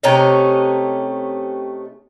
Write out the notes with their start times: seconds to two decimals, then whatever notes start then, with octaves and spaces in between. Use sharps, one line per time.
0.03 C3 A3 C#4 D#4